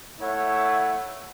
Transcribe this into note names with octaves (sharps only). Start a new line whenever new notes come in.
A3 E4 C#5 F#5